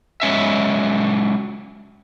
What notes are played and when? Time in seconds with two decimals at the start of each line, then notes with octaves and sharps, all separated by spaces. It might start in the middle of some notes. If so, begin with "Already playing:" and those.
0.22 F#3 G#3 C#4 E5